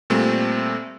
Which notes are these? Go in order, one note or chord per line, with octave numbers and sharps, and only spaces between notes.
A#2 G3 A3 C4